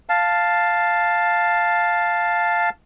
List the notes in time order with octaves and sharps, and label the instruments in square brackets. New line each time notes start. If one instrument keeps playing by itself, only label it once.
[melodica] F5 A5